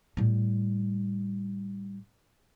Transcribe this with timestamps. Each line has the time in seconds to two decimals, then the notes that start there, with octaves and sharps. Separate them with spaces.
0.17 A2 G3